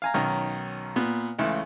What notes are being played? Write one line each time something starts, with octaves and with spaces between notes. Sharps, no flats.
F5 G#5 A#5
B1 D#3 C#4 A#5
A#2 B3
C#2 C#3 E3 A3